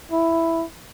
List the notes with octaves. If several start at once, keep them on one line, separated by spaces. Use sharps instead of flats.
E4